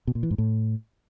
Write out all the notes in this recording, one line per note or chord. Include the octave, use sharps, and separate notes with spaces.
B2
A#2
E3
G#2
A2